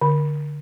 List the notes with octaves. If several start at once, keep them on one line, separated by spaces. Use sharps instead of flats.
D3